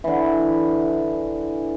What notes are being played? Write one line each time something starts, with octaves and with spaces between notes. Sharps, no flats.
D3 E3